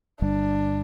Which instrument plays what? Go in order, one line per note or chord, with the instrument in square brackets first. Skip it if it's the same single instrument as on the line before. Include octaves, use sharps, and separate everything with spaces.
[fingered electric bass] G1 G2 D3 G3 [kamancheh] D4